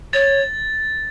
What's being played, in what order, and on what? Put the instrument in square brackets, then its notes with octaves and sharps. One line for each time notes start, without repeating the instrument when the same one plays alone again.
[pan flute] C#5 [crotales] A6